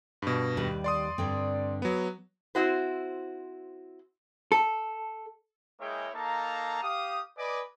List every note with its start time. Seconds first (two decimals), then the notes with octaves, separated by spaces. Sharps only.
0.22 G2 B2
0.57 D#2 G3 B4
0.84 D5 C6 D#6
1.18 G2 D3 C4
1.82 F#3 B3
2.55 C4 E4 F#4 C5
4.52 A4
5.80 G#3 A#3 E4 G#4 C#5 G5
6.14 A#3 D#4 A4 F5 A5 A#5
6.83 G4 F5 D#6
7.37 B4 D5 D#5 G#5 D6